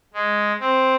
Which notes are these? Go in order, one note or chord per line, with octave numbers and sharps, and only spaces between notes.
G#3
C4